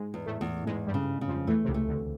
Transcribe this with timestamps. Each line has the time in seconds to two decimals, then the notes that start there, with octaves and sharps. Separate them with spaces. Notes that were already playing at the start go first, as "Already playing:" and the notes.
Already playing: G#2 G#3
0.14 E2
0.26 A2 A3
0.41 E2
0.67 E2 G#2 G#3
0.87 G2 G3
0.94 C#3
1.21 C#3
1.28 F2 F3
1.47 E2 E3 A3
1.65 C3
1.68 C#2 C#3
1.74 A3
1.88 D2 D3